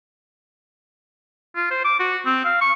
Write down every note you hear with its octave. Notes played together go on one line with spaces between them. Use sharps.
F4
C5
D6
F#4
C4
F5
C#6